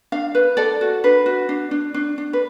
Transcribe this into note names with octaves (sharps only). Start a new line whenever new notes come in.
D4 F5
B4
A4 D5
F#4
D4 B4
F#4
D4
D4
D4
D4
B4